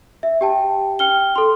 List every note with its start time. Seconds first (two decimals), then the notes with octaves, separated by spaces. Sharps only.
0.23 E5
0.41 G4 G5 A5
0.99 G5 F6 G7
1.36 A4 C6